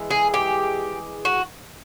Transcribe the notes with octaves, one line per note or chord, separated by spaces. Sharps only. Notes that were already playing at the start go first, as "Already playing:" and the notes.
Already playing: E3 G#3
G#4
G4
F#4